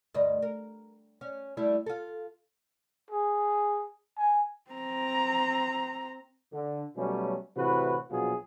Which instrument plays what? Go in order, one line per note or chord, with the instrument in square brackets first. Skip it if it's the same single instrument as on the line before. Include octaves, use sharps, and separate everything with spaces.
[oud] D2 G2 D#5
A#4
C#4
G3 A3 E4
F4 A4
[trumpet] G#4
G#5
[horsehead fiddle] C4 A#5
[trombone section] D3
B2 F#3 G3 A3 C#4
A2 C3 E3 F#4 B4
A#1 B2 F#3 F4 F#4 G#4